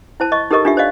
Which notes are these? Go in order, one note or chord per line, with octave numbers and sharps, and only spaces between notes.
E4 C5 A5
D#5 C#6
D#4 G4 A4 A#4 D#5 C#6
D4 F4 G4 E5
C5 D5 D#5 F5